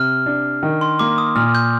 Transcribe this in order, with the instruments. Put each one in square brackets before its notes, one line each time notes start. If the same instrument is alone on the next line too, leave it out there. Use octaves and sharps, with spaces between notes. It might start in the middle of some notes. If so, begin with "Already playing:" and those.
Already playing: [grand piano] C3 [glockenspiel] F6
[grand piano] D4
D#3
[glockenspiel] C6
[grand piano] A#3 [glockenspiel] D6
[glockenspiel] D#6
[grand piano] A#2 [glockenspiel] F6
[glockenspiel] G6